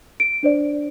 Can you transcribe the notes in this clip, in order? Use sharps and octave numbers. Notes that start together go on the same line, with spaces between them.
D7
D4 C5 D5